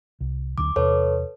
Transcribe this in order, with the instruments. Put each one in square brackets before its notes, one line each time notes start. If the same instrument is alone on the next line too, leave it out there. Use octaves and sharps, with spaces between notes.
[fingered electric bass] C2
[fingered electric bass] D2 D3 F#3 [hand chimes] D6
[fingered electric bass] E2 C3 [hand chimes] A4 B4 C#5